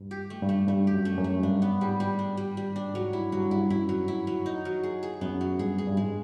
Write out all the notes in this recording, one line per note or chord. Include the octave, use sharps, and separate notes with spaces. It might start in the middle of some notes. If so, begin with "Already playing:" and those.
Already playing: G2
G4
A3
G2
A3
G2 A3
G4
F#2
A3
F#2
A3
G2 D4
B3
G#2 G3
G3
D4
G3
G3
D4
G#2 F#3
G2 E4
G2 F#3
G2 E4
F#2 E4
F#3
E4
F#3
D#4
F#3
G#4
G#4
F#2 B3
F#3
G2 G#4
G#4
G2
G#2 G#3